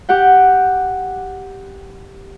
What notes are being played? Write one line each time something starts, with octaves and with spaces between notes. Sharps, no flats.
G4 F#5 G5